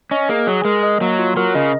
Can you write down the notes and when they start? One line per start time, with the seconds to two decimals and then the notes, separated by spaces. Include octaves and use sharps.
0.11 C#4 D#5
0.29 A#3 G#4
0.47 F#3 G#4
0.65 G#3 A#4
0.83 D#5
1.01 F#3 A#3
1.19 F4
1.37 F#3 A#4
1.55 C#3 D#5